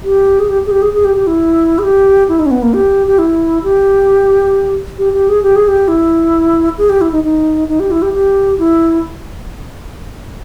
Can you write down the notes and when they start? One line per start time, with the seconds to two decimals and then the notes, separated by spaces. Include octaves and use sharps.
0.04 G4
0.39 G#4
0.49 G4
0.66 G#4
0.71 G4
0.82 G#4
0.94 G#4
1.05 G4
1.16 G4
1.27 E4
1.79 G#4
1.83 G4
2.29 E4
2.39 D#4
2.46 C#4
2.51 B3
2.62 A#3
2.74 G4
3.07 G4
3.18 E4
3.64 G4
4.98 G4
5.13 G4
5.29 G#4
5.43 G4
5.56 G#4
5.68 G4
5.88 E4
6.78 G#4
6.89 G4
7.01 E4
7.12 D#4
7.24 D#4
7.69 D#4
7.80 G4
7.91 E4
8.02 G4
8.14 G4
8.59 E4